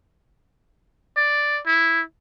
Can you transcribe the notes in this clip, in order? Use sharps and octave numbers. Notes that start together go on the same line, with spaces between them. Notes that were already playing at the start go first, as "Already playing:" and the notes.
D5
E4